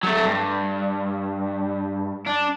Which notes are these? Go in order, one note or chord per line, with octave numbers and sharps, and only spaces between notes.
F#3 A3
G2
D4